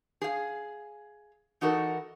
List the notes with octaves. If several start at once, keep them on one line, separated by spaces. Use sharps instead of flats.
G#4 F5
E3 D#4 F#4 A4 A#4